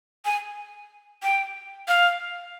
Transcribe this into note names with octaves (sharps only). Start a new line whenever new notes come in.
G#5
G5
F5